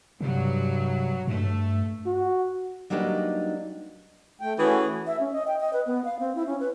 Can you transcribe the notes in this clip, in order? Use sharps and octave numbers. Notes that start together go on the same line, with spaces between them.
G2 C3 F#3
G2 A3
F#4
F#3 G3 A#3 D4 D#4 B4
A3 G5
E3 A3 C#4 F#4 G#4 B4
E5
C#4
D#5
G5
D#5
B4
B3
F5
C4
E4
C#4
B4